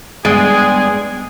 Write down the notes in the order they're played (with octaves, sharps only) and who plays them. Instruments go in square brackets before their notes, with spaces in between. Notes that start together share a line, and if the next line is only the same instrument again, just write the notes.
[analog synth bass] G2 [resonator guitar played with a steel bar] G#3 [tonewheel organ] B3 D5 G5 [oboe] G#4